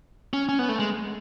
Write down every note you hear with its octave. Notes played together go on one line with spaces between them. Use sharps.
C#4
C#4
B3
A3
G#3